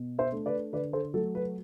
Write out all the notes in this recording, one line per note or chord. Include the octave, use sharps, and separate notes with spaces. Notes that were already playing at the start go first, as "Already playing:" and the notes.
Already playing: B2
C5 E5
A3 D4
B4 D5
D3 B4 D5
A4 C5
F#3 A3 A4
B4